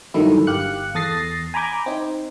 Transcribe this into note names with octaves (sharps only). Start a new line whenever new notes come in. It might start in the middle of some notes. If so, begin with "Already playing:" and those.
G2 D3 D#3 F#3 A3 E4
G1 G4 F5 F#6 C#7
E2 A4 D#6 A6 A#6 C7
G#5 A#5 B5 D6 G6 G#6
C4 D#4